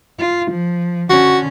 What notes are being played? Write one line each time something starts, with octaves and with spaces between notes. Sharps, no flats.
F4
F3
D3 C#4 F#4